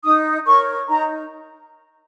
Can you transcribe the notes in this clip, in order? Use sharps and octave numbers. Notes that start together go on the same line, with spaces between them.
D#4 D#6
A#4 C#5 C#6
D#4 A#5